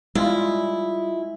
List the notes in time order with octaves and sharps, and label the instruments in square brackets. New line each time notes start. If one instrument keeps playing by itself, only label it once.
[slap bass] G3 [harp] G#3 [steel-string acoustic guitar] E4 [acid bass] F4